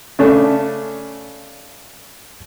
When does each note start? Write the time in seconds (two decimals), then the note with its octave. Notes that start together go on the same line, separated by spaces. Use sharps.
0.19 C#3 A3 D4